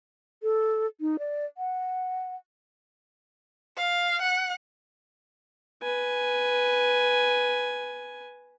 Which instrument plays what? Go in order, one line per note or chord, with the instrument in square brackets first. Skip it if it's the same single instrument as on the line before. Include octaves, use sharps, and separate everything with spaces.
[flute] A4
D#4
D5
F#5
[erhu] F5
F#5
[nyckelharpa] B4 G#5